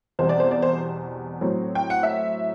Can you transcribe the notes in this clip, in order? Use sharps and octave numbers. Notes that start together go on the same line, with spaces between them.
E2 B2 G3 C4 C5
D5
C5
D5
C5
A2 F#3 C4
G5
F#5
E5